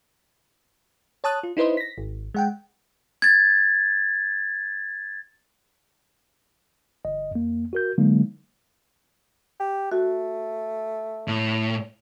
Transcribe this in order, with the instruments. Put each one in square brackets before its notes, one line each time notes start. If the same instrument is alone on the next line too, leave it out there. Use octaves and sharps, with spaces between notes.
[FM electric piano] C#5 A5 D#6 F#6
F4
D#4 E4 B4 C5 D#5
A#6 B6
G#1
G#3 F#5 G5
[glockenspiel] G#6 A6
[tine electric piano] G1 D#5
F2 A#3
F#4 A#4 G6
D3 F#3 G#3 A#3 D#4
[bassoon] G4
[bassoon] A3 [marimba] F#4
[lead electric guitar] A2